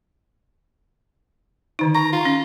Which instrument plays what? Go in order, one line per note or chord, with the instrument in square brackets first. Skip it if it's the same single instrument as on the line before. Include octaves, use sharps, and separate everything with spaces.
[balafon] D3 D#3 D#4
[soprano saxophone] A#5 [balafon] C#6
[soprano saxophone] F4
[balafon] C#4